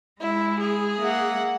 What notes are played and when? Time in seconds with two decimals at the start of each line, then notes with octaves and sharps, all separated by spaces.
0.21 G#3 E4
0.60 G#4
0.98 A#3 E5 F#5